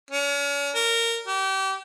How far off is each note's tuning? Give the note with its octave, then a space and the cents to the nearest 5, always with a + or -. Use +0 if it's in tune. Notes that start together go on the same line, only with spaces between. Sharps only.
C#4 +40
A#4 -15
G4 -30